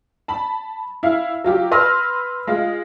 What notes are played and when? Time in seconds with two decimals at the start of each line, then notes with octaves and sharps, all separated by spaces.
0.28 A5 B5
1.03 E4 F5
1.44 F#3 F4 G4
1.72 B4 C6 E6 F6 A#6
2.47 G#3 F4